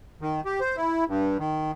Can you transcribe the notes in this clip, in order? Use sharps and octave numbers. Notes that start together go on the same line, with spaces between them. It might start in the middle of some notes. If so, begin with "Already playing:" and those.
D#3
G4
C5
E4
G2
D#3